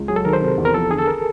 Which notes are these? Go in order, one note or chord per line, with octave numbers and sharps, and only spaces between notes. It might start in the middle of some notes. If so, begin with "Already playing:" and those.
Already playing: C#2
F#3 G#4
A4
D#3 A#4
C5
C3
E2
A#4
F3 A4
D3 G#4
A4
A#4